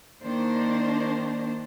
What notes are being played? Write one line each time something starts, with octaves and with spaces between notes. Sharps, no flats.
D#3 A#3 D4 C5